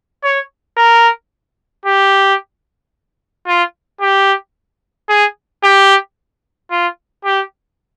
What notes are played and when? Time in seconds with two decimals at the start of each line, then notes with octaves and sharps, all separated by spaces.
0.23 C#5
0.77 A#4
1.86 G4
3.47 F4
4.01 G4
5.09 G#4
5.63 G4
6.71 F4
7.25 G4